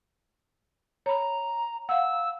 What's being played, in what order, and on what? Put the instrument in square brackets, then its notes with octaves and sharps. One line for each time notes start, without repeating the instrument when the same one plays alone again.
[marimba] C#5 B5 [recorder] A#5
[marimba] F5 F#5 [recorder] E6